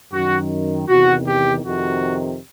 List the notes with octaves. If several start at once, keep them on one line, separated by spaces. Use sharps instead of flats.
F#2 D#3 F#4
E2 C3 D#3 F#4
G4
F2 C3 D#3 F#4